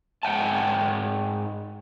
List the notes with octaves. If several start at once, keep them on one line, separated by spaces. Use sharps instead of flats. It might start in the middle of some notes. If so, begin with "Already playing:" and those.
G#2 F#5 G5 A5